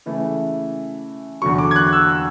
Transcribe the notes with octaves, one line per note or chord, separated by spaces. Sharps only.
C#3 E3 A3
E2 D3 F#3 C#6
D6
G#6
F#6
E6